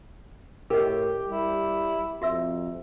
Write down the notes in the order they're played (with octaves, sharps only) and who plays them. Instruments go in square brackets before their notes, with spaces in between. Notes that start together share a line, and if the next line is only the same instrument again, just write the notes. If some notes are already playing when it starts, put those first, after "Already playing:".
[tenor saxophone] A2 [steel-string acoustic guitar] G4 [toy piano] A#4 D#5
[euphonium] G3 [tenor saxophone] E4
[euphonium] F2 [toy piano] F#4 E5 E6